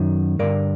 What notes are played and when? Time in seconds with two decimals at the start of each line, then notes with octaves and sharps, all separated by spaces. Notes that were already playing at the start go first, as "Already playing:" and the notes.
Already playing: F#2 D#3
0.39 G2 D3 A#4 D5